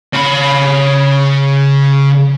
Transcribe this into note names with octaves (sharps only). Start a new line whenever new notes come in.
C#3 B5